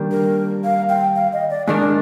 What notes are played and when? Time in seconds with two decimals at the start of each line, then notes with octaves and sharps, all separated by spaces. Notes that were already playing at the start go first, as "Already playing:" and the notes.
Already playing: D#3 G3 A#3 D4
0.12 A#4
0.64 F5
0.89 G5
1.16 F5
1.33 D#5
1.50 D5
1.68 G#2 D#3 A#3 D4 D5